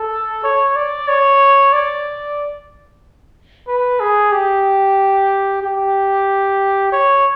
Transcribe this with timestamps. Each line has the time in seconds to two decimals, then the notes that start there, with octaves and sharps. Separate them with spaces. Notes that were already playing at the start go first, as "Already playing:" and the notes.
Already playing: A4
0.43 C#5
0.76 D5
1.08 C#5
1.73 D5
3.68 B4
4.00 G#4
4.32 G4
5.62 G4
6.92 C#5